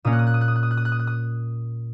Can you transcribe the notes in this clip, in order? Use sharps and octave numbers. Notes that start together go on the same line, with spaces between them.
A#2 A#3 C#4 D#6
F#6
D#6
F#6
D#6
F#6
D#6
F#6
D#6
F#6
D#6
F#6
D#6
F#6
D#6